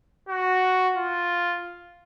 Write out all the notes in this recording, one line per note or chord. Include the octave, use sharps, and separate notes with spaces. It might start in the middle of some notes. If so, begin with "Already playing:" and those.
F#4
F4